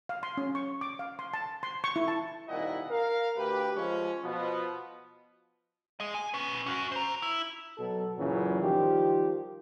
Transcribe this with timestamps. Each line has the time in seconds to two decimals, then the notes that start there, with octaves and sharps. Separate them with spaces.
0.09 F5
0.23 C6
0.37 C#4
0.55 C#6
0.81 D6
0.99 F5
1.19 C6
1.34 A5
1.63 C6
1.84 C#6
1.96 E4
2.08 A5
2.48 C2 A#2 D#3 E4 D#5 F#5
2.90 A#4 F5
3.37 D2 G4 B4
3.76 F3 G#3 C#4
4.23 B2 F3 B3
6.00 G#4 D#5
6.15 G#5
6.34 C#4 B4
6.66 C#4 F#4
6.92 C5 A#5
7.22 E4
7.77 B2 F#3 A4
8.17 F#2 A#2 C#3 E3 F#3
8.61 D#3 F3 G3 F4 G4